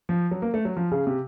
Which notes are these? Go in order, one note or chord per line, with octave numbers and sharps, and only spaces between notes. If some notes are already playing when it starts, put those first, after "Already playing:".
F3
F#3
A#3
A3
F#3
F3
C#3
C3